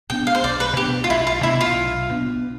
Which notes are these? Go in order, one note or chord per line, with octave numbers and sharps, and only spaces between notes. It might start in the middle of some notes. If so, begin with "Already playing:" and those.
B2 B3 D4 G5
F5
C5
B1 D5
B4
B2 B3 D4 G4
F4
B1 E4
F4
B2 B3 D4 E4
F4
B1
B2 B3 D4